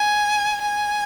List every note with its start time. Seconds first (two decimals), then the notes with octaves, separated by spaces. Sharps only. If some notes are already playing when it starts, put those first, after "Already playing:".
Already playing: G#5
0.61 G#5